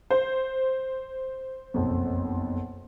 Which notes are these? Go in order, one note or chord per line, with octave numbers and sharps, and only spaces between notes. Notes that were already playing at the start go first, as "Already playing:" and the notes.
C5
F#1 B1 F2